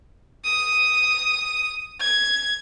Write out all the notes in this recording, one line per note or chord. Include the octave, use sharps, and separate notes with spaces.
D#6
G#6